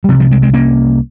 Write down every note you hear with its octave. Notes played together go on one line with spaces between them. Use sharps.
G3
C2 C3 F3
F3 G#3
G#3 C4
G#3 C4
A#3 C#4